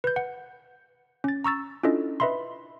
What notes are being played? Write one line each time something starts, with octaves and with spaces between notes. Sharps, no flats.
B4 G6
F#5
C#4 A6
A#5 C#6 E6 A6
C#4 D4 E4 F4 A4 D#5
B4 D#5 E5 B5 C6